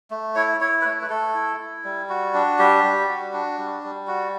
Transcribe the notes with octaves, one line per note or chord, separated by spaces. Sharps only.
A3
E4 C#5
E4 C#5
B4
A3 C#5
B4
A3 A4
E4
E4
G3
F#4
D4
G3 G4
G3
F#4
D4
G3
G3
F#4